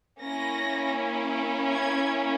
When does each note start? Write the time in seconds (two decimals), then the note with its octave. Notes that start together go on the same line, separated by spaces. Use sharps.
0.21 A#3 C#4 E4 A#6
1.74 G#6